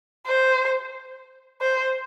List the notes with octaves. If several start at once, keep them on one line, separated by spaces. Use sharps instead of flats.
C5
C5